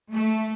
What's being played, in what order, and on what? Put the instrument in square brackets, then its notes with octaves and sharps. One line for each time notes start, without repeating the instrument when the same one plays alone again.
[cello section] A3